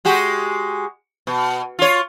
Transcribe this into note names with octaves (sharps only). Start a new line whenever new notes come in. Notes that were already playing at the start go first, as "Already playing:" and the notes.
G#3 F#4 G4
B2
F4 C#5